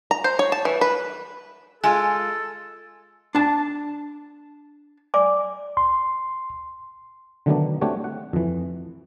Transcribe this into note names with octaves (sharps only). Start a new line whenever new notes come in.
A#5
C5
C#5
A5
E3
B4
G#3 F4 A4 G#5
D4 A5
D5 G#5 D6
C6
D3 D#3 F#3 A3 B3 D4
A3 C4 D4 F#4 G4 C#5
F#5
F2 E3